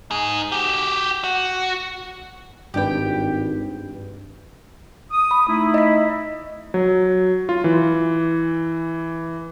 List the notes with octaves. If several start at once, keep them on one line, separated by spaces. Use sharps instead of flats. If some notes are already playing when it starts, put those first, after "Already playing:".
D#4 G#4
F#4 G4
F#4
G#1 G2 D4 G4 B4 G5
D#6
B5
A3 D#4 E4
D#5 B6
F#3
F4
E3